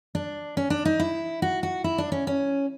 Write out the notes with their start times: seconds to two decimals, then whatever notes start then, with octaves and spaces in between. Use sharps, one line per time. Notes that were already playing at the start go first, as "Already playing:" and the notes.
0.15 D4
0.57 C#4
0.70 D4
0.85 D#4
1.00 E4
1.42 F#4
1.63 F#4
1.84 E4
1.98 D4
2.12 C#4
2.27 C#4